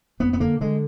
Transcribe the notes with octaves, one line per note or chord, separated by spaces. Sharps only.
F2 B3
B3
D3 A#3
D3 G#3